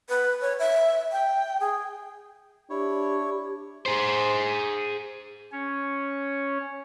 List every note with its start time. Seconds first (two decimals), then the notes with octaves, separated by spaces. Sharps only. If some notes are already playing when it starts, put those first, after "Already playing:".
0.09 B4
0.41 C#5
0.59 E5
1.12 G5
1.60 G#4
2.70 D4 E4 G4 C#5
3.86 G#4 C5
5.52 C#4 C#5